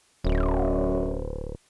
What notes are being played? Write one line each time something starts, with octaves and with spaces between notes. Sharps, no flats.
D1 F#2